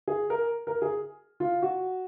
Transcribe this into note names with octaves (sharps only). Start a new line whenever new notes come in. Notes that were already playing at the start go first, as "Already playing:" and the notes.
G#4
A#4
A#4
G#4
F4
F#4